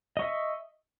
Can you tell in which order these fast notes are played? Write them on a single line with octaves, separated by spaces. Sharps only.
D#5 C#6 E5